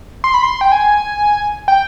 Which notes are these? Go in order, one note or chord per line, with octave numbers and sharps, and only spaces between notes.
C6
B5
C6
G5
G#5
G5